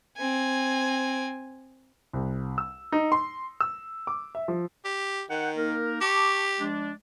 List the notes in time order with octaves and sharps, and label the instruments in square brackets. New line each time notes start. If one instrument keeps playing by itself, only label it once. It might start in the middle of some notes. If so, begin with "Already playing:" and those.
[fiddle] C4 G#5
[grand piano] C2
E6
D#4
C6
E6
D6
E5
F3
[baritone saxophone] G4
[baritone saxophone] D#3 [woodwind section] F#5 G5
[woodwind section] A#3 D#4 A#4
[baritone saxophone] G4 [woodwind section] A5 C#6 D6
[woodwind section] F3 G#3 D4